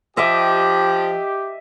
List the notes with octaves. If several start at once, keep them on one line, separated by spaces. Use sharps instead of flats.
F3 G4 D#5 E5 D6